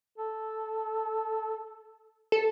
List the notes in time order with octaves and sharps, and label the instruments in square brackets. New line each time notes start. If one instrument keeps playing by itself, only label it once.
[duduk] A4
[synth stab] A4